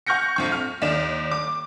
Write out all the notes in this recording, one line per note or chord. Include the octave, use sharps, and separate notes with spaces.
F#5 C#6 F6 G6 A#6 C#7
A#1 F2 C#6
F6
D#2 D#4 D5 E7
D6